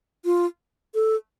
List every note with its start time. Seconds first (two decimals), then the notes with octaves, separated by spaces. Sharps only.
0.25 F4
0.94 A4